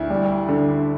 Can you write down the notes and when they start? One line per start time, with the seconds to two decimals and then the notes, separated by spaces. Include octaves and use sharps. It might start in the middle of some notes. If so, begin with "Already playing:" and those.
Already playing: D2 E4
0.10 G3
0.49 D3